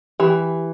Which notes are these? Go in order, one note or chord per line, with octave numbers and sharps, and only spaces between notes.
E3 G4